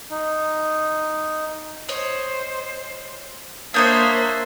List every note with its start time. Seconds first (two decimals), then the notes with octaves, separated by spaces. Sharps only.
0.11 D#4
1.89 C5 C#5 D#5
3.74 A#3 D4 C5 C#5 E5 D#6 G6 G#6